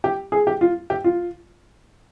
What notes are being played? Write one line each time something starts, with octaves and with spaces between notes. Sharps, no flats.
G4
G#4
G4
F4
G4
F4